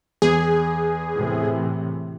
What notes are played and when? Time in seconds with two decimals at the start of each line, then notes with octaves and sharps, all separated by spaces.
0.22 E2 G#4
1.14 A2 C3 E3